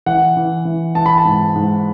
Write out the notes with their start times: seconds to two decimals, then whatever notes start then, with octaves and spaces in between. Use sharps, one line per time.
0.06 E3 F#5
0.37 E3
0.65 E3
0.95 E3 A5
1.06 B5
1.18 A5
1.25 G#2
1.55 G#2